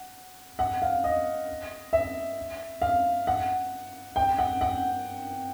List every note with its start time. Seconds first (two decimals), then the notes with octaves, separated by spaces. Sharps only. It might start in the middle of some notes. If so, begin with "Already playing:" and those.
Already playing: F#5
0.59 F#5
0.82 F5
1.04 D#5
1.93 E5
2.82 F5
3.27 F#5
4.16 G5
4.38 F#5
4.61 F#5